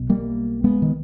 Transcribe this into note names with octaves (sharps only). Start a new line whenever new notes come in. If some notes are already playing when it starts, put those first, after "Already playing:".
Already playing: B1 B2
G3 A#3
G#3 B3
D#3